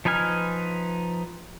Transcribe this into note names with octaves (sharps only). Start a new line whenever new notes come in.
F3 D#4 B4 G#5 F6